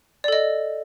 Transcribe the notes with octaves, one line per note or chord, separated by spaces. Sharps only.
A4 D5 D#5